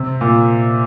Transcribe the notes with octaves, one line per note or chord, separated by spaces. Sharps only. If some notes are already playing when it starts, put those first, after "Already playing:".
Already playing: C3
A#2